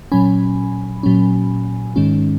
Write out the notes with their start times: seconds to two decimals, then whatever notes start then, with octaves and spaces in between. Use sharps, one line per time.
0.12 A#2 F#3 C#4 G#5 B5
1.03 A#2 F#3 C#4
1.96 G#2 D#3 G#3 C#4